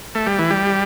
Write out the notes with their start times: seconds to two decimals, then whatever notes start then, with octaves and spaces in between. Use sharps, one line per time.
0.15 A3
0.26 G3
0.39 E3
0.50 G3